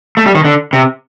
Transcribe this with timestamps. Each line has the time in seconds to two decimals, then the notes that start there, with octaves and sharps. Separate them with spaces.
0.17 A3
0.26 G3
0.35 D#3
0.45 D3
0.73 C3